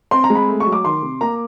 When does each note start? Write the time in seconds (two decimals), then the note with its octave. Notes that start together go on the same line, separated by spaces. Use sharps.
0.11 C4 C6
0.24 A#5
0.30 G#3
0.35 B5
0.48 A3
0.60 C#6
0.66 F#3
0.72 D6
0.85 D#3 C6
1.02 C3
1.21 A#3 A#5